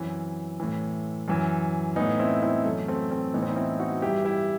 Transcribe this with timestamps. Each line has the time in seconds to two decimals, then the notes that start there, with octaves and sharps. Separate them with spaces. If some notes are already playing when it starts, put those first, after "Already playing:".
Already playing: F#2 E3 C4 E4
0.60 A2 E3
1.28 F#2 E3
1.96 A2 E3 B3 D#4
2.19 C4 E4
2.42 C4 E4
2.65 F#2 E3 A3
2.88 A3 C4
3.11 A3 C4
3.34 A2 E3 B3 D#4
3.42 C4
3.49 D#4
3.56 C4 E4
3.79 D#4 F#4
4.02 G2 E3 E4 G4
4.25 E4 G4